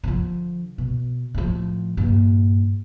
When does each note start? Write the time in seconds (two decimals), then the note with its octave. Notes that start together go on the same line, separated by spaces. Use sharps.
0.04 D3 F3
0.78 B2
1.35 A2 F3
1.97 A#1 G2